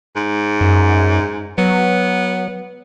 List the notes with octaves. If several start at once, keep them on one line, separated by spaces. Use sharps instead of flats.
G#2
F#2
F#3 B3